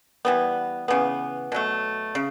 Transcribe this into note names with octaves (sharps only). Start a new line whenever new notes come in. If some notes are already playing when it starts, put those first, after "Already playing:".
E3 G3 B3
C#3 E3 B3
B2 F#3 A3
C#3